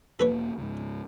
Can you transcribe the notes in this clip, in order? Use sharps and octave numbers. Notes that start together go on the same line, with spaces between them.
E1 A#3 A4 B4 C#5
C#2 G#2